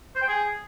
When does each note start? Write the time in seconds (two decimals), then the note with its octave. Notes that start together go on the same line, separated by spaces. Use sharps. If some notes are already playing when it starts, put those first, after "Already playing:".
0.16 C5
0.22 G5
0.28 G#4